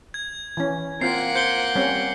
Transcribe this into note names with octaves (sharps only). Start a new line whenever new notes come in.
G#6
E3 C#4
A#3 C4 F4 F#5 C7
C5 G6 C#7 G7
G3 C4 C#4